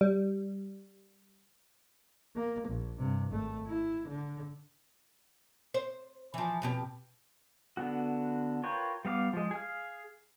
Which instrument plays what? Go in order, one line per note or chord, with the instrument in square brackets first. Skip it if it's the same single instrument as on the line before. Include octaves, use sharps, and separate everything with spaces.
[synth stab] G3
[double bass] A#3
A#1
G2 C3
G#1 A3
E4
D3
[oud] C5
E3 F3
F2 B2 G4
[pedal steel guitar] D3 B3 F#4
F4 A#4 B4 C#5 G5
G3 B3 F5 D6
F3 G#3
G#4 F5